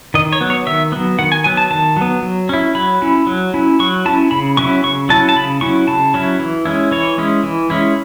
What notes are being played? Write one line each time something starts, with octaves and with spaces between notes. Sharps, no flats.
D#3 D#5
C#5
F#3 B3
C#5
D#3 E5
F#3 B3
D#3 F#5
G#5
F#3 B3 G#5
A5
D#3 A5
F#3 B3
F#3
C#4 E4
F#3 B5
C#4 E4
F#3
C#4 E4
F#3 C#6
C#4 E4 A5
C#3 B5
F#3 C#4 E4 C#6
C#3 C#6
F#3 C#4 E4 A5
A5
C#3 B5
F#3 C#4 E4 C#6
C#3 A5
F#3 C#4 E4
E3
G#3 C#4 E4
E3 C#5
G#3 C#4 E4
E3
G#3 C#4 E4